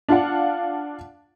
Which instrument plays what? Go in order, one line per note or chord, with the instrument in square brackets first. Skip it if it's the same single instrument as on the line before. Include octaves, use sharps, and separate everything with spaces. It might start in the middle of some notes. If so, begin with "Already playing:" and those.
[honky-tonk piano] D4 F4 D5 F5 F#5